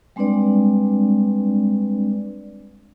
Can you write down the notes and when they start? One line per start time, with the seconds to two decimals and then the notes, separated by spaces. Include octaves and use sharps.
0.16 G3 G#3 C4 D4 B4 D5